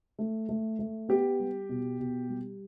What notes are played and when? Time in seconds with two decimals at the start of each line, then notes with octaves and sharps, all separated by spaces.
0.19 A3
0.49 A3
0.79 A3
1.09 B3 G4
1.39 G3
1.69 B2
1.99 B2
2.29 G3